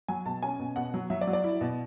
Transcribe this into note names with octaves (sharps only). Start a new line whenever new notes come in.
F#3 G#5
B2 A5
C#4 G#5
B2
B2 F#5
F#3
F#3 E5
D5
F#3
D5
E4
B2